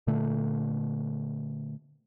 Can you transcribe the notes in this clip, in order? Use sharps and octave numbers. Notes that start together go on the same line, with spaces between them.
A#2 D3 A3